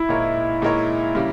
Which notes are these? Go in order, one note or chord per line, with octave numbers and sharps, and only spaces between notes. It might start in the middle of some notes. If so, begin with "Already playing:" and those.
Already playing: E4
A#2 G#3 D#4 A#4 C#5
A#2 G#3 D#4 A#4 C#5
C#3 G3 A#3